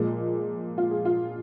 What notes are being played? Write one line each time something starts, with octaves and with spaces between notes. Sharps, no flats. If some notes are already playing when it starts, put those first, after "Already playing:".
Already playing: A#2 F3 G#3
F4
G#4
F4